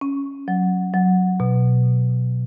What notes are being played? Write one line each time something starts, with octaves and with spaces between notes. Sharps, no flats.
C#4
F#3
F#3
B2